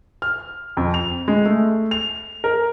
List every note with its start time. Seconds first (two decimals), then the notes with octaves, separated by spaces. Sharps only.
0.22 F6
0.77 F2
0.94 F7
1.28 G#3
1.45 A3
1.91 F7
2.44 A#4